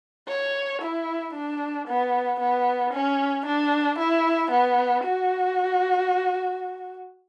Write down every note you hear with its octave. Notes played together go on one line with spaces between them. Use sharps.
C#5
E4
D4
B3
B3
C#4
D4
E4
B3
F#4